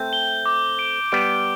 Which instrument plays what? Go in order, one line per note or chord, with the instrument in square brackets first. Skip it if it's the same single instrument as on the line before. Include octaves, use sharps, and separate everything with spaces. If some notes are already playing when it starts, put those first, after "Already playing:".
Already playing: [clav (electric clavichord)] A3 C4 [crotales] G6
[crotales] G7
D6
D7
[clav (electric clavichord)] G3 B3 [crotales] D7